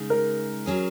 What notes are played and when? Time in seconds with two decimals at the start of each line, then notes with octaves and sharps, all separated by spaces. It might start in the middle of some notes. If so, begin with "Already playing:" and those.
Already playing: C#3 G#3 D#4
0.10 A#4
0.66 F#3 C#4 G#4